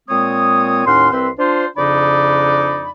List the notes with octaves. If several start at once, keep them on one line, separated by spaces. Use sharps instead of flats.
A#2 G#3 C4 C#5 D#6
D#2 A2 C#4 F#5 C6
C2 C4 B4 E5 C6
D4 F4 C5
F2 C#3 D4 D#4 D5 B5